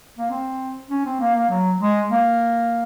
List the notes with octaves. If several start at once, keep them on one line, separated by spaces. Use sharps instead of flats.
A#3
C4
C#4
C4
A#3
A#3
F#3
G#3
A#3